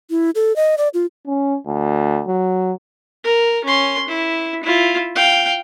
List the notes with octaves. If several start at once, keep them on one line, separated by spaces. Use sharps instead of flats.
E4
A4
D#5
D5
F4
C#4
D2
F#3
A#4
C#4 C6
E4
E4 F4
F5 G5